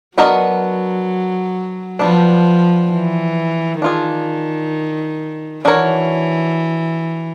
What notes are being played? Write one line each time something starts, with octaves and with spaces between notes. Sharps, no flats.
F#3 B3 D4 F#4 A#4 D#5
F3 G3 B3 D4
E3
D#3 D4 F4 G#4
E3 D4 F#4 A#4 C#5